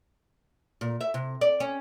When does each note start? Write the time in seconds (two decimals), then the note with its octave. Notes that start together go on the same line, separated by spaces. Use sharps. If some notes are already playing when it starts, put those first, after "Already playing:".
0.81 A#2
1.01 E5
1.14 C3
1.41 D5
1.60 C#4